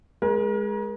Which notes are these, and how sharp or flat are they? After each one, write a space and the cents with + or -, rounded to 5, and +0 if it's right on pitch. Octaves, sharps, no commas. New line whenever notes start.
G#3 +0 A#4 +35